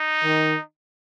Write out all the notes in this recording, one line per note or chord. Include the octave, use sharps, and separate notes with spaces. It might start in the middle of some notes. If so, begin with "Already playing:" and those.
Already playing: D#4
D#3